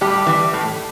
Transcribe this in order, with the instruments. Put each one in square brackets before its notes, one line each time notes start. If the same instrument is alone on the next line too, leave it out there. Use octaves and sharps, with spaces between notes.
[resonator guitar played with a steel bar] A2 G3 G4
E3 G3
A2